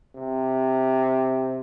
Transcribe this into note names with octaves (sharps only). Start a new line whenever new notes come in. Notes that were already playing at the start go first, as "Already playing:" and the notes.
C3